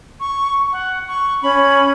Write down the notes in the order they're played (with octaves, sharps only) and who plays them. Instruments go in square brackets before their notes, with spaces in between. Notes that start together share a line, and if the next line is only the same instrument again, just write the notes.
[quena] C#6
F#5
C#6
[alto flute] C#4 [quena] B5